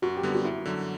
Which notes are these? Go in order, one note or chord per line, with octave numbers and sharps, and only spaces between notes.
F#2 F#4
G4
D3 G3 B3
F#4
F#2 E4
D3 F#3